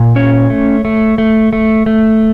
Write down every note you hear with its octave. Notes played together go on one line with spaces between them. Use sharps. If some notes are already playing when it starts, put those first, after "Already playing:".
Already playing: A#2
C#4 C#5
A3
A3
A3
A3
A3